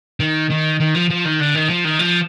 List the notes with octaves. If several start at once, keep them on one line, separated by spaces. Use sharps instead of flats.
D#3
D#3
D#3
F3
F3
D#3
D3
D#3
F3
D#3
F3